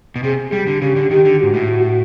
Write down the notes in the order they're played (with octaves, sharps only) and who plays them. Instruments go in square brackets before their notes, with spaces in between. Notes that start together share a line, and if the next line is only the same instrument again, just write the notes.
[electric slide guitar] B2
[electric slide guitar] C3 [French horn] G#4
[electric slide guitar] G3 [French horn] G4
[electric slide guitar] D3
[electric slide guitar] C#3 [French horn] G4
[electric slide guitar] D3
[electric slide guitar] D#3 [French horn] G4
[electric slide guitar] D3
[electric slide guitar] G#2 [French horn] F#4
[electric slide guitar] A2
[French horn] F#4